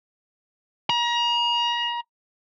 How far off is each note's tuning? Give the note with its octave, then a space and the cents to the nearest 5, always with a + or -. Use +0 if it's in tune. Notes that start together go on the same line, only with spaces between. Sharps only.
A#5 +35